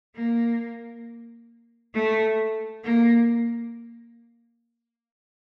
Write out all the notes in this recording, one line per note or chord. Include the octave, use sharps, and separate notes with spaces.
A#3
A3
A#3